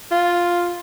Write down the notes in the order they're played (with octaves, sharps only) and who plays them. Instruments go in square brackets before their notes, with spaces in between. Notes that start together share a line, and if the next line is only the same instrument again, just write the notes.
[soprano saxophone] F4